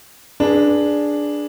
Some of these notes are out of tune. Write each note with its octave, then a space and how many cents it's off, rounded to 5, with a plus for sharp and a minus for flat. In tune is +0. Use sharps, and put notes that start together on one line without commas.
D4 +0 G#4 +0 B4 -35